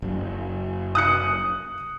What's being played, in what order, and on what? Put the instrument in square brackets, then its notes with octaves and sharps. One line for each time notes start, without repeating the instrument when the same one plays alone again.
[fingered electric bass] F#1 F#3
[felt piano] D#6 F#6 C#7